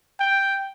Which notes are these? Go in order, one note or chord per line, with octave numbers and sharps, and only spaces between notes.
G5